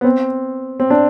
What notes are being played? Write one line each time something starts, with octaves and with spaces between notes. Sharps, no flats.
B3
C4
C4
D4